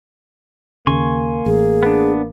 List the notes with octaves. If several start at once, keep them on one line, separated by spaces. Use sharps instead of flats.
D#2 C#3 A#3 G#5 C6 C#6
A1 G#4
B3 D4